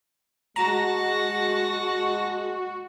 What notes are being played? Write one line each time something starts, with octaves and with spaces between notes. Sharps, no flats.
G#3 F#4 A5 A#5 A#6